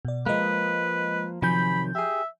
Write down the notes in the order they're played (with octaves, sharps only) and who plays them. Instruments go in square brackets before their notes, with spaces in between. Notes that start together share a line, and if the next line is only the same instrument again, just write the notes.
[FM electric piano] B2 D5
[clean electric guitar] F3 A#3 [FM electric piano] G#3 D#5 [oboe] B4
[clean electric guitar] C3 D#3 F#3 [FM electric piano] F3 G#5 G6 [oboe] B5
[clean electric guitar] G4 G#4 [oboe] E5